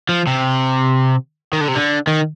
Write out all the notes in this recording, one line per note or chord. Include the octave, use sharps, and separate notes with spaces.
F3
C3
D#3
D3
C3
D3
D#3